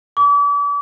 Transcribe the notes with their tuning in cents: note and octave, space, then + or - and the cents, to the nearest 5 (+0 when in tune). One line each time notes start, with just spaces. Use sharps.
D6 -40